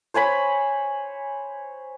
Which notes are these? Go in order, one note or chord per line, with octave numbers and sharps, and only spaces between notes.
C5 C#5 G#5 B5